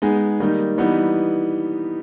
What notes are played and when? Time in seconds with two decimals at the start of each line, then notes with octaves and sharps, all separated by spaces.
0.02 G#3 B3 D#4 G#4
0.40 D#3 G3 A#3 D#4
0.78 E3 G3 B3 D#4